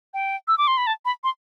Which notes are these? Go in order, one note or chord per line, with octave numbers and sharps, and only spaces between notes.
G5
E6
D6
C6
B5
A5
B5
C6